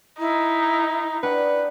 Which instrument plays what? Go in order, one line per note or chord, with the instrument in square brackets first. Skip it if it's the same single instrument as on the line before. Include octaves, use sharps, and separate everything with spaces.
[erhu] D#4 [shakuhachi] E4
[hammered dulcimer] D4 F#5 G5 [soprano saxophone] B4